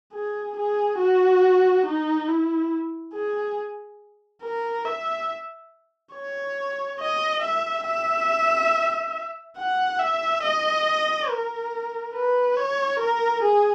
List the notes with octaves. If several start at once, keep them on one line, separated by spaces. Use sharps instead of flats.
G#4
G#4
F#4
D#4
E4
G#4
A#4
E5
C#5
D#5
E5
E5
F#5
E5
D#5
A#4
B4
C#5
A#4
G#4